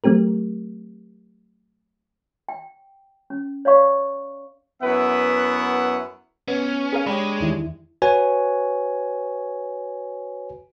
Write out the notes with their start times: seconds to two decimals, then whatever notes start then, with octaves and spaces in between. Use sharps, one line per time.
0.04 F#3 A3 C4 G4 A#4
2.49 G5
3.30 C#4
3.65 C#5 D5 F5 C#6
4.82 F#2 B3 E4 B4 E5 F#5
6.48 B3 C#4
6.93 G#4 A#4 F5
7.07 G#3 D4 G4 C#5 B5
7.40 E2 D#3 E4
8.02 F#4 B4 C#5 G#5